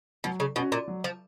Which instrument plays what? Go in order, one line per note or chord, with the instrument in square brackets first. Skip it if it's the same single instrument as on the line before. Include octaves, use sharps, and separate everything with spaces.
[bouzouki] B2 [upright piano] F#3
[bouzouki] C#3
[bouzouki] B2 [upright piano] C#4 F#4
[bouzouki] A#2
[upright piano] F#3
[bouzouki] F3